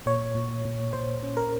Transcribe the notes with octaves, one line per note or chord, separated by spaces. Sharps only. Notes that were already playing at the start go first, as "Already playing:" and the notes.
A#2 C#5
A#2
A#2
A#2 C5
C#4
A#4